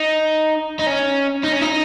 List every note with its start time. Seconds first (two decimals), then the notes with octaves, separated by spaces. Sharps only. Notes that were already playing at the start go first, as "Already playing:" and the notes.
Already playing: D#4
0.79 D#4
0.87 C#4
1.43 D#4
1.52 C#4
1.61 D#4